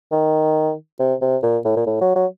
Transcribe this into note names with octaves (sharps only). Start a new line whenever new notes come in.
D#3
C3
C3
A#2
A2
A#2
A2
F#3
F#3